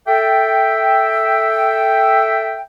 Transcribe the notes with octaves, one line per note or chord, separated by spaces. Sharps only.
A4 E5 G5